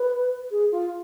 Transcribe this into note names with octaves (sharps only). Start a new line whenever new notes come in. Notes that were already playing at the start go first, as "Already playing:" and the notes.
Already playing: B4
G#4
F4